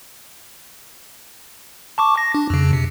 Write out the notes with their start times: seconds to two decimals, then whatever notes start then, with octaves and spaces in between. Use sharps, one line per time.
1.98 A5 C#6 D6
2.17 A#6
2.35 D4
2.50 F2 C#3
2.73 C3